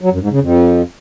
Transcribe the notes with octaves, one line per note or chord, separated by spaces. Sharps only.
F#3
F#2
G#2
C#3
F2